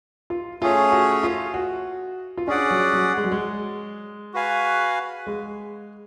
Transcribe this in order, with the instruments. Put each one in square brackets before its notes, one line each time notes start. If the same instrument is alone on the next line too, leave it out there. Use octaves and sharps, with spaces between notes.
[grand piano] F4
[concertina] A3 C#4 G#4 C#5 [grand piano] F4
[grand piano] F#4
F4
F#4
F4
[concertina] C#4 G#4 D5 F#5 [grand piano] D4
[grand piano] F#3
F#3
G#3
F#3
G#3
[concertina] F#4 B4 F5 G#5
[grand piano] G#3